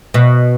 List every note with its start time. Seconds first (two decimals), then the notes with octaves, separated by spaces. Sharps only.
0.14 B2